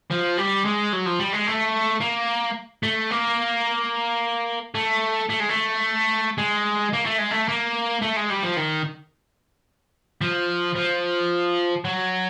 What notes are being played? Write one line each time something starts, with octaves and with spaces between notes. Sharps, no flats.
F3
G3
G#3
F#3
F3
G3
G#3
A3
A#3
A3
A#3
A3
A3
G#3
A3
G#3
A#3
A3
G#3
A3
A#3
A3
G#3
G3
F3
D#3
F3
F3
F#3